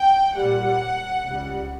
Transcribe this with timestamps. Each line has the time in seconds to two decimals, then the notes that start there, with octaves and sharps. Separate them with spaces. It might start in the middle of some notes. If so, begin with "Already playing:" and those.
Already playing: G5
0.36 A#2 G3 F#5
1.25 C#2 C#3 G3